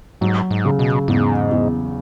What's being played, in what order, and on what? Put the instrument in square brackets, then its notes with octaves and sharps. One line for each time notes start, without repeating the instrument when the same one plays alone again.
[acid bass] G#2 [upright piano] F#3
[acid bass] G#2
[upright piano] C#3
[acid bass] B2
[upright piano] E2 [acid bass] G#2
[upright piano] E2